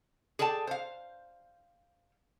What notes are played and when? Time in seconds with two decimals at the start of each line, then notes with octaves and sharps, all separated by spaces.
0.39 G#4 A4 D5 G5 A5
0.67 C5 F5